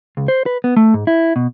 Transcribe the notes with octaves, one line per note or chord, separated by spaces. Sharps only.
C#2
C5
B4
B3
A3
G#2
E4
B2